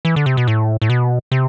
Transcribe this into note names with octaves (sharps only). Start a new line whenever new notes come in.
E3
D3
C3
B2
A2
A2
B2
C3